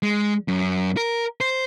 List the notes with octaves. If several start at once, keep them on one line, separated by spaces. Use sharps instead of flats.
G#3
F#2
A#4
C5